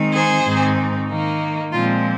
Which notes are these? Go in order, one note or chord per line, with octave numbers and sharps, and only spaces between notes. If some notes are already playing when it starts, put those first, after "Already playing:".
Already playing: D#3 G#3 C4 D#4
G#4 C5
G#2 D#3 C4 D#4
D#3 A#3 D#4
A#2 F3 G#3 C4 F4